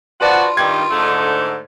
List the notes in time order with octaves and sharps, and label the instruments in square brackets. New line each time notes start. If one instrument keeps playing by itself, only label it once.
[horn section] F3 F#4 [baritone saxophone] F4 [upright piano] B4 D5 A5
[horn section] G2 D#3 G3 [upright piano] G#6
[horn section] G#2 D3 A3